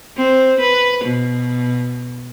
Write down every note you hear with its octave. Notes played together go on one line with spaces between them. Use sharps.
C4
B4
B2